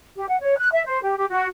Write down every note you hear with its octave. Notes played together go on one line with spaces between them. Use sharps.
G4
F#5
C#5
F#6
E5
C5
G4
G4
F#4